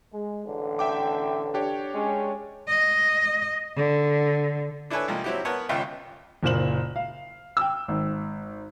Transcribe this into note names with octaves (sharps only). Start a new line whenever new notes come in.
G#3
A1 D3
E5 G5 D6
D4 G4 C#5
G#3 C#4
D#5
D3
D4 E4 A4 B4 C#5 G#5
C2 F3 A#3 D#5
F#3 C4 E4 F#4 G4
B3 A#4 C#5 F#5 A5
G#1 C#2 F4 E5 G5
F#1 A#2 C5 E7 F#7
F5
G5 E6
G#1